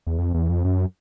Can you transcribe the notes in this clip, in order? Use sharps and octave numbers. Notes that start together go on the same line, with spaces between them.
E2
F2
E2
F2
F#2